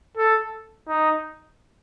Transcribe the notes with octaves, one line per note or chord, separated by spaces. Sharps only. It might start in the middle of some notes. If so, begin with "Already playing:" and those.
A4
D#4